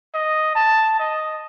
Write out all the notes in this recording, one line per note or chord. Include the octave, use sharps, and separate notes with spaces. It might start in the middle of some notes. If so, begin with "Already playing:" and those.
D#5
A5
D#5